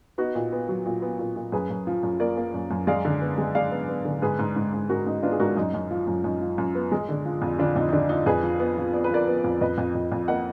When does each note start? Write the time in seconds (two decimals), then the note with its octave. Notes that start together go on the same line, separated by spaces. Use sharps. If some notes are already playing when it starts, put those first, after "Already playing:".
0.18 B3 D#4 F#4
0.35 A#2
0.52 B3
0.69 F#3
0.86 A#2
1.02 B3
1.19 A#2
1.36 A#2
1.52 F#2 G#4 B4
1.70 F#2
1.87 F3
2.03 F#2
2.20 A#3 A#4 D5
2.37 A#3
2.54 F#2
2.71 F#2
2.87 G#3 D5 F5
3.05 D3
3.21 B3
3.38 G#3
3.55 G#3 D5 F5
3.71 B3
3.89 B3
4.05 D3
4.22 G#2 G#4 B4
4.39 G#2
4.56 G#2
4.73 G#2
4.89 G#2 F#4 A#4
5.07 G#2 D#4
5.23 B3 D4 F4
5.32 G#4
5.40 G#2 F#4 A#4
5.57 F#2 D#4
5.74 F#2
5.91 F3
6.08 F#2
6.24 F#2 D#4
6.41 F3
6.58 F#2
6.75 B3
6.92 G#3
7.09 D3
7.25 F3
7.42 F2
7.59 D3 D4 F4
7.76 F2 D#4
7.88 D#4
7.93 D3 D4
8.09 F3 D#4
8.26 F2 G#4 B4
8.43 F3
8.60 B3
8.77 F3
8.93 B3 D5
9.04 B4
9.11 F3 A#4 D5
9.28 B3
9.44 F2
9.61 F2 B4 D#5
9.78 F2
9.95 F2
10.12 F2
10.28 A#3 D#5 F#5